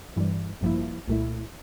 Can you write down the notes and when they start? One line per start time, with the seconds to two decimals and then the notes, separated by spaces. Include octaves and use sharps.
0.16 G2 E3 G3
0.61 A1 G2 F3 A#3 E4
1.08 C2 A#2 A3 E4